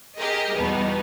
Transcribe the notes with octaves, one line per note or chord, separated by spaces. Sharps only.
G4 G#4 A#4 D#5
E2 B2 G3 B3 D#4